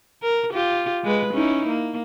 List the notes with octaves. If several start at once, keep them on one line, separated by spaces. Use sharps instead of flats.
A#4
F4 G4
G#3 B4
C#4 D#4 E4
A#3